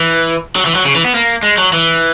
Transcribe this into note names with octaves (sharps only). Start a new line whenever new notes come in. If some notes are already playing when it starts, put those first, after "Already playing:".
Already playing: E3
F#3
E3
F#3
C#3
E3
B3
A#3
G#3
F#3
E3